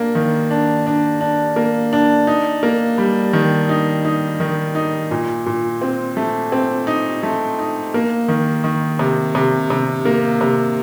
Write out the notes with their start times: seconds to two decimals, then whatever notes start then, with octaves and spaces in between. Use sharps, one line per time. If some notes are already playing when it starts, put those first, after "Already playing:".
Already playing: A#3 D4
0.15 D#3
0.51 D4
0.87 D4
1.21 D4
1.56 A#3
1.93 D4
2.27 D#4
2.63 A#3
2.98 G3
3.33 D#3
3.69 D#4
4.05 D#4
4.40 D#3
4.75 D#4
5.11 A#2
5.46 A#2
5.82 C4
6.17 A3
6.52 C4
6.87 D#4
7.23 A3
7.59 D#4
7.94 A#3
8.28 D#3
8.64 D#3
8.99 C3
9.35 C3
9.70 C3
10.05 A#3
10.41 C3